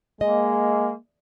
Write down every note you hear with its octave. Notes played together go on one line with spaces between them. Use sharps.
G#3 A#3 D#5